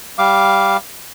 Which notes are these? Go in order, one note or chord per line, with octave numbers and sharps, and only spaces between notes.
G3 F5 D6